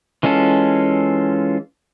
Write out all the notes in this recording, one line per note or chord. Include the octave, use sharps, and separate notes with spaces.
E3 G#3 C#4 F4 A4